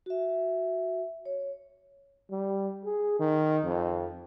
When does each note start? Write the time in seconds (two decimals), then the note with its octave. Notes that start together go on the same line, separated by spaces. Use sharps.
0.06 F#4 E5
1.26 C#5
2.30 G3
2.85 G#4
3.19 D#3
3.64 F2